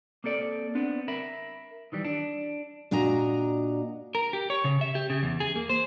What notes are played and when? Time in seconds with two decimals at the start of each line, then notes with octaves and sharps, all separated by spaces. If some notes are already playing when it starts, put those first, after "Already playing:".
0.24 A#3 C4 A4 D5
0.75 B3 C4 D4
1.08 A#4 E5 B5
1.92 D#3 E3 G3
2.05 D4
2.91 A#2 D4 F#4 D#5 A#5
4.15 A#4
4.33 G4
4.50 C#5
4.64 C#3
4.81 E5
4.95 G4
5.10 C#3
5.23 E2
5.40 G#4
5.56 A#3
5.69 C5